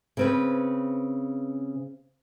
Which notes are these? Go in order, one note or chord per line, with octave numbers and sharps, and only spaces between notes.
C#3 C4 B4